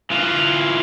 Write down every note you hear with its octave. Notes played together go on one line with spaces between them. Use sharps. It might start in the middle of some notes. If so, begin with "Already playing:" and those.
E3 F4